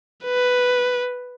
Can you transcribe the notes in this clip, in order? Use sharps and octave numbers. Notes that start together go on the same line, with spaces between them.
B4